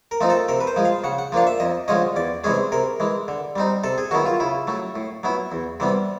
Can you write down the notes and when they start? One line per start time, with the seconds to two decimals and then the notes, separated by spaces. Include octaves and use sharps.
0.11 A#4
0.21 F3 A3 C4 D#4
0.30 A4
0.48 C3 A#4
0.60 B4
0.67 C5
0.76 F3 G#3
0.85 F5
1.04 C#3 F#5
1.19 F#5
1.32 F3 A#3 D4 F5
1.47 E5
1.60 F2 D#5
1.88 D3 F3 G#3 C#4 D#5
2.16 E2 D5
2.44 C3 E3 G#3 C#4 G#4
2.72 C3 A#4
3.00 E3 G#3
3.28 D3
3.56 G3 C4 D#4
3.84 C3 A4
3.98 G#4
4.11 D#3 F#3 B3 E4 F#4
4.26 F4
4.40 C#3 E4
4.67 F#3 A3
4.96 A2
5.23 F#3 B3 E4
5.52 E2
5.80 C3 E3 G3 B3